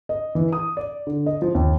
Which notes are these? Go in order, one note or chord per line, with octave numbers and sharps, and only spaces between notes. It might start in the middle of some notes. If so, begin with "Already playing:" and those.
D#5
E3
D#6
D5
D3
D#5
F3
D#2